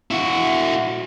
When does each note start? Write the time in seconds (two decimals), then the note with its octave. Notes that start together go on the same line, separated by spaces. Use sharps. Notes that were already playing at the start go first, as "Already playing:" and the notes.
0.11 E4 F#4